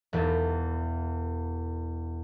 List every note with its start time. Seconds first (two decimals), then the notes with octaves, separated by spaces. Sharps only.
0.13 E1 E2